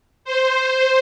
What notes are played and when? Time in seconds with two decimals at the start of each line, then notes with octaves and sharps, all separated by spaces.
0.25 C5